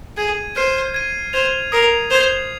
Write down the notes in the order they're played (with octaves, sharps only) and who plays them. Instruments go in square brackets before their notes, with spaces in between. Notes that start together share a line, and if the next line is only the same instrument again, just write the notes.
[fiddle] G#4 [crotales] G#6 D#7
[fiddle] C5 [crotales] F6 C7 D#7
[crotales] G#6 D#7
[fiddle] C5 [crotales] G#6 F7
[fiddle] A#4 [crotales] D#6 C7 F7
[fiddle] C5 [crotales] G#6 F7